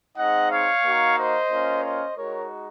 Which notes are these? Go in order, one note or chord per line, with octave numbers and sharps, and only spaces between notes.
G#3 C4 D#4 D#5 F#5
C#5 F5
A#3 D#4 F#4
C5 D#5
A#3 C#4 F4
C5 D#5
G#3 D#4 F#4 A#4 C#5